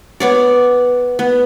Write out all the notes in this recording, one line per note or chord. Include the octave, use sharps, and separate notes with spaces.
B3 C#5 D5
B3